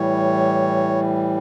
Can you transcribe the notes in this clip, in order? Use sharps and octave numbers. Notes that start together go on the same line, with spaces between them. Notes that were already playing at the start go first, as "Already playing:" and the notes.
Already playing: A2 E3 G3 C#5